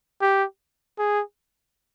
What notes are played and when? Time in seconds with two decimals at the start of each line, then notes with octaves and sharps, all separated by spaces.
0.21 G4
0.99 G#4